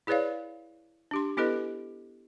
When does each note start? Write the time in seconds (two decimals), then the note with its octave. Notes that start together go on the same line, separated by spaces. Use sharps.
0.07 E4 G#4 B4 C#5 D5 F5
1.11 D4 G4 C6
1.37 B3 E4 G4 A4 B4 D#5